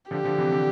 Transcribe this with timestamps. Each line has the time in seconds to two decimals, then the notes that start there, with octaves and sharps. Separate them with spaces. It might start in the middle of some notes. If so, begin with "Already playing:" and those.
0.11 D3 F3 G4
0.25 D3 F3
0.38 C3 E3
0.52 D3